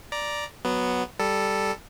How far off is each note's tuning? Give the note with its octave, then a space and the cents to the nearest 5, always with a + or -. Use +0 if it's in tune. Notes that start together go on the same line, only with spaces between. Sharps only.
D5 +0 A#5 +10
F#3 +0 B3 +0
G3 +5 A4 +0